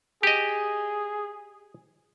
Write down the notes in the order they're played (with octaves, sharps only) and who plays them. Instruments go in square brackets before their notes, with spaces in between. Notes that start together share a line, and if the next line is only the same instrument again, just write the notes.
[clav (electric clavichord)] G4 D#5 [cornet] G#4